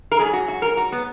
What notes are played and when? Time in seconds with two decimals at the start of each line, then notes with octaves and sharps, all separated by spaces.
0.12 A#4
0.19 G#2 F#3 G#4
0.33 F#4
0.48 F#4
0.62 A#4
0.77 F#4
0.92 B3